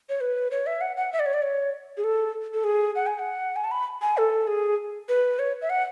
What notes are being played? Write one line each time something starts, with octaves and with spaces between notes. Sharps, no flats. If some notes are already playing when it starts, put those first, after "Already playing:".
C#5
B4
C#5
E5
F#5
F#5
E5
D5
C#5
D5
C#5
G#4
A4
A4
G#4
F#5
G#5
F#5
G#5
A5
B5
G#5
A4
G#4
B4
C#5
E5
F#5